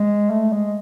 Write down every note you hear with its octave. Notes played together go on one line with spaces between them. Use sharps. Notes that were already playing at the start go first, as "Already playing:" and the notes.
Already playing: G#3
A3
G#3